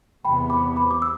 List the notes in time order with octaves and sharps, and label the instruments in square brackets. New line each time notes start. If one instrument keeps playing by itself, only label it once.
[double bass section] E2 C3 E3 B3 [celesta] G5 B5
[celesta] B5 D6
B5 D6
D6
E6